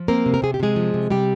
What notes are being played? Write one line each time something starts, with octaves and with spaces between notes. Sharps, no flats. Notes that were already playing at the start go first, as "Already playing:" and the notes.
Already playing: F3
A#3 C4 A#4
C3
A#4
C3 G#4
G4
C3 G#3 G#4
F3
C3
C3 G3 G4